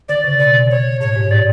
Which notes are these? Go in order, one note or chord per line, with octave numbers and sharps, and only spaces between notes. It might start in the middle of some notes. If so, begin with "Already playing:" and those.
D3 D5
C#3
B2 D5
C#5
A2 C#5
G#2
A2 D5